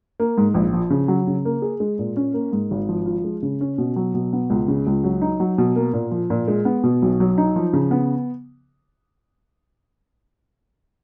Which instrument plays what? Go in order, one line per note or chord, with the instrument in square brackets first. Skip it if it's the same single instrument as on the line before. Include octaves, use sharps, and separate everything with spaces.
[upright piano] A#3
G#2
A#1
F3
C#3
F#3
C#3
A#3
G#4
G#3
A#2
C#4
A#3
G#2
G#1
F3
F4
G#3
C#3
C#4
B2
F#3
B2
B3
C#2
C#3
C#2
F#3
D#4
F#3
B2
A#3
A#2
F3
A#2
G#3
B3
B2
B1
F#3
D#4
F3
C#3
B3